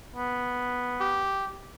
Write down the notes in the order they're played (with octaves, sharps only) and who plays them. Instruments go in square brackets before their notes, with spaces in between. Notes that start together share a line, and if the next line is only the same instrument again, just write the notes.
[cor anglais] B3
[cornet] G4